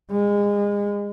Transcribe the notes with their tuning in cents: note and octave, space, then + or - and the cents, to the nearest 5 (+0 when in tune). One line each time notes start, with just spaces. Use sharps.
G#3 -30